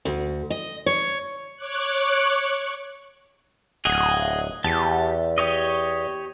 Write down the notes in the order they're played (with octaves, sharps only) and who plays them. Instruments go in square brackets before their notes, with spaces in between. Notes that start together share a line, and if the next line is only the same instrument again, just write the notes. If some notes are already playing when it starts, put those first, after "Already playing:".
[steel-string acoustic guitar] D2
D#5
C#5
[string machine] C#5 C#6 D6 F#6
[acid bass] D1 [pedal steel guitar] G#4 D#5 F#5
[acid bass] E2 [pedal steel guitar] G4 A5
[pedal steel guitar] G4 C#5 D#5